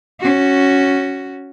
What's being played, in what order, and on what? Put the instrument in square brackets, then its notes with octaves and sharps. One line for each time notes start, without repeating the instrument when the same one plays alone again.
[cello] C#4 F#4